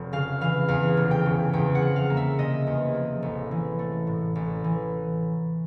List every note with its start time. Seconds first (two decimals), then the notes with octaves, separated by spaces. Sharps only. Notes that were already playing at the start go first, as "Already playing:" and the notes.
Already playing: F1
0.13 C#3 F5
0.41 E3 F5
0.68 E2 F5
0.97 F1
1.11 G5
1.26 C#3
1.53 E2 G5
1.75 F#5
1.82 F3
1.96 F5
2.10 A#3
2.17 E5
2.38 C3 D#5
2.67 E2
2.94 F3
3.22 A1
3.51 E3
3.79 A3
4.07 A2
4.35 A1
4.64 E3